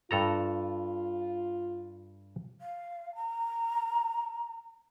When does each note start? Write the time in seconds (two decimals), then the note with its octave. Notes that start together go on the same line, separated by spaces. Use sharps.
0.11 G2 F4 A4 A#5
2.60 F5
3.15 A#5